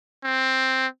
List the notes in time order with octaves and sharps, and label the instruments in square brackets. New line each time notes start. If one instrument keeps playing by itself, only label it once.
[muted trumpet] C4